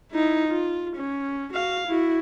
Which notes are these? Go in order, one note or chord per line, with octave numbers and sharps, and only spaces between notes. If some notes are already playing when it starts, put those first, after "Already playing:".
D#4 E4
F4
C#4
F#4 F5
E4 F#4